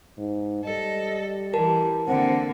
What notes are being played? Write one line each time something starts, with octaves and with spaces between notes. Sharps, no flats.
G#2
G3 A4 D#5
E3 G4 A#4 A5
D3 A#3 C4 F#5